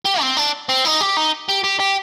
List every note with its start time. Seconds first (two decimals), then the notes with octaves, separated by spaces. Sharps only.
0.05 G4
0.21 C4
0.37 D4
0.69 C4
0.85 D#4
1.01 G4
1.17 D#4
1.49 G4
1.64 G4
1.80 G4